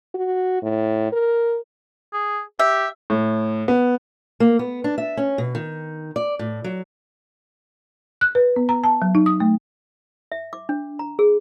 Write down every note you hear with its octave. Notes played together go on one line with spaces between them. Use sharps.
F#4
A2
A#4
G#4
G4 E5
A2
B3
A#3
B3
D4
E5
C#4
B2
D#3
D5
A2
F#3
F#6
B4
B3
A#5
A5
F#3
D#4
D#6
A3
E5
D6
D4
A#5
G#4